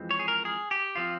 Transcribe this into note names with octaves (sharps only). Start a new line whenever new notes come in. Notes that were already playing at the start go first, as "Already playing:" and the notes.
Already playing: F2 E3 G#3 C4
C#5
G#4
A#4
G#4
G4
F3 C4 F4